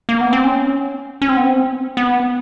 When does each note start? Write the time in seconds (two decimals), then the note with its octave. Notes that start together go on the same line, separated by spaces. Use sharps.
0.09 A#3
0.21 B3
0.33 C4
0.44 C#4
1.22 C#4
1.29 C4
1.37 B3
1.44 C4
1.97 B3